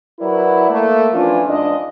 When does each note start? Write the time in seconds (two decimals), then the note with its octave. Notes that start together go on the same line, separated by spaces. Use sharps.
0.20 F#3 E4 A#4 B4 D5
0.70 A3 A#3
1.13 E3 F3 C#4 D4 F4
1.48 G#2 D4 D#5